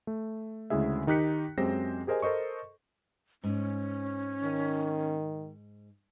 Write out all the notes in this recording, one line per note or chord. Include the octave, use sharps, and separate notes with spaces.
A3
D2 C#3 G#3 E4 G#4 E5
D#3 D#4 G4 F#6 B6 C#7
F#2 G#3 C4 G4 C5 A#6
G4 G#4 A#4 C5 D#5 G#5
A4 A#4 C5 D#5 C#6
G#2 C#4
D#3